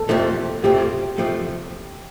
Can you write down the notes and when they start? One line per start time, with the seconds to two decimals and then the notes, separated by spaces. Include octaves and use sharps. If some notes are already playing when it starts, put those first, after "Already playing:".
Already playing: A4
0.09 F2 C3 F3 A3
0.63 F2 C3 F3 A3 G4
1.18 F2 C3 F3 A3